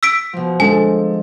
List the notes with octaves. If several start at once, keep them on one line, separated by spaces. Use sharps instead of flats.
E6 B6 D7
B2 F3
D3 F3 G#3 A4 G#5